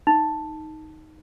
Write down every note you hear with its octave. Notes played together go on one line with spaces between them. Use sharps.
D#4